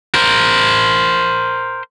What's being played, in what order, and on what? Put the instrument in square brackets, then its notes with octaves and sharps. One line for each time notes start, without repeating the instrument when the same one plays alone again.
[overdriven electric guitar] A#4 C5